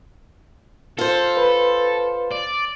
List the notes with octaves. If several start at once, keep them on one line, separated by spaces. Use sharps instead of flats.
F4 A4 C5
B4
D5